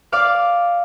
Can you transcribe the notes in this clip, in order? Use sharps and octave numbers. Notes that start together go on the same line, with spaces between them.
D5 F5 D6